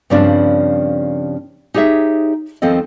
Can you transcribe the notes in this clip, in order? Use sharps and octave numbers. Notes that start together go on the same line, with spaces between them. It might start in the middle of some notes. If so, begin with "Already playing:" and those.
G2 C#3 F3 G3 C4 D4
D#4 G4 G#4 C#5 E5
D#2 F3 C4 A4 D#5